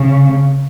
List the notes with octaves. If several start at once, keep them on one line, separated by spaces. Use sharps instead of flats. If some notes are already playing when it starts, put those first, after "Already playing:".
Already playing: C#3